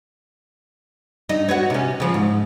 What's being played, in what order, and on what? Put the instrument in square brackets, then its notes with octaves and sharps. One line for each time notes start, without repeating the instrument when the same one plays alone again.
[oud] G2 D#4
F#4 B4 C#5
C3 C#4
C#3 F3
G#2